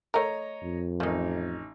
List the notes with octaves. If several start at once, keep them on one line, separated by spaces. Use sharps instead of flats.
A3 A#4 C#5 D#5 A#5
F2
A1 D#3 F3 D#4